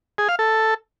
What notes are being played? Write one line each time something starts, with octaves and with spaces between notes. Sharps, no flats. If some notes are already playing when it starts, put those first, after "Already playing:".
G#4
F5
A4